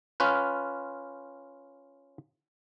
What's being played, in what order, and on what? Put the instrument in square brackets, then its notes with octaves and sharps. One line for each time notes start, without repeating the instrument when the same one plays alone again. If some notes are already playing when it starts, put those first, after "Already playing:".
[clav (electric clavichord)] C#4 F4 B4